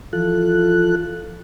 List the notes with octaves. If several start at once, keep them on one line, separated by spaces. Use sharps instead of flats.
E3 F3 F4 A4 F#6